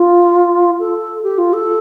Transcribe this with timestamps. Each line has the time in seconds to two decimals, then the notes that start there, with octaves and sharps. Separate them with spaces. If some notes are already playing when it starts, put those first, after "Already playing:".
Already playing: F4
0.79 A4
1.23 G4
1.38 F4
1.53 A4